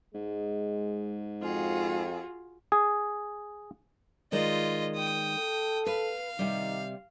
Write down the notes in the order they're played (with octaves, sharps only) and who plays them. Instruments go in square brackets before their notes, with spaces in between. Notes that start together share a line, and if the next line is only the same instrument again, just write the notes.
[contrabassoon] G#2 [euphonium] G#3
[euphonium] F2 [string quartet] F4 F#4 G#4
[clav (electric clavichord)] G#4
[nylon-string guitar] D#3 G#3 D5 [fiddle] F4 D#5
[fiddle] G5 D#6
[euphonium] A4
[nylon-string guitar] B4 [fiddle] F5
[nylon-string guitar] C3 G3 [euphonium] D#3